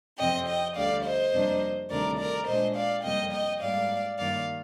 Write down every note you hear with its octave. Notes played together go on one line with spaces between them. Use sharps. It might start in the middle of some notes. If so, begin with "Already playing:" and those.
F2 C3 F3 C4 D#5 G5
D#5 G5
D2 D3 G3 D5 F5
C5 D#5
F2 C3 G3 A#3 D4
D2 C3 D#3 G3 D4 A#4 D5
A#4 D5
A#2 G#3 D4 C5 D#5
D5 F5
F2 C3 G3 A#3 D#5 G5
D#5 G5
G#2 G3 A#3 D5 F5
G2 D#3 G3 A#3 D5 F5